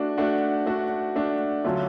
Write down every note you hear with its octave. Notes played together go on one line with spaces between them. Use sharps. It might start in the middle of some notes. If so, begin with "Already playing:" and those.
Already playing: A3 D4 F#4
A3 D4 F#4
A3 D4 F#4
A3 D4 F#4
D3 F#3 A3 C#4 F4